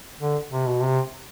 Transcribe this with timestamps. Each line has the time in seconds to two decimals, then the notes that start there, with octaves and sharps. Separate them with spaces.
0.20 D3
0.51 C3
0.67 B2
0.83 C3